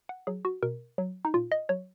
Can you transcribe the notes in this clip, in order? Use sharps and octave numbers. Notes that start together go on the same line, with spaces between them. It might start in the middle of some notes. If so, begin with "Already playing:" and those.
F#5
F#3 G#4
F#4
B2 A#4
F#3
D#4
A#2 F4
D#5
F#3 C#5